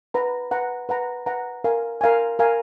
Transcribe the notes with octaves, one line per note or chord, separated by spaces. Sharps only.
B4 F#5 A#5
B4 F#5 A#5
B4 F#5 A#5
B4 F#5 A#5
A#4 F5 G#5
A#4 F5 G#5
A#4 F5 G#5